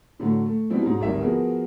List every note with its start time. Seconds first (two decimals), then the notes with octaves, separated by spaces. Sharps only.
0.19 A2 D3 F#3 A3
0.46 A3
0.70 B2 E3 G3 C4 E4
0.82 G#2 F#3
1.00 D1 G#1 D#3 G3 E5
1.20 F3 B3 F#4 G#4 A#4